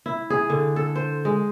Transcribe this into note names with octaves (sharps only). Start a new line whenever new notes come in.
E4
G#4
D3
A4
C5
G#3